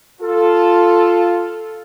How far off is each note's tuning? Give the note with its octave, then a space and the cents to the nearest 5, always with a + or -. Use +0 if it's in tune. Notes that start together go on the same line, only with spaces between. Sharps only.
F4 +0 A4 +0